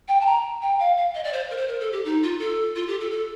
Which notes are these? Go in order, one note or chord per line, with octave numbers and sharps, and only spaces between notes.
G5
A5
A#5
G5
F5
F5
D#5
D5
C5
A#4
C5
A#4
A4
G4
D#4
F4
A4
F4
G4
A4
A4